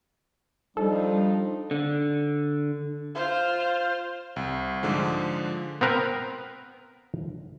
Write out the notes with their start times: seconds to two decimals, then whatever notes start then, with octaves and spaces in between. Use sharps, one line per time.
0.77 F3 G3 D4 D#4 A4
1.71 D3
3.15 F4 C5
4.36 C2
4.83 G#2 D3 F3 G#3
5.81 B3 C4 A#4 B4